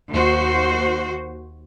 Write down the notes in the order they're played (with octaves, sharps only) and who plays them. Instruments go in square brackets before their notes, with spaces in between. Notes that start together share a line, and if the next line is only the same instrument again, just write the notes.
[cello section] D#2 F#4 C5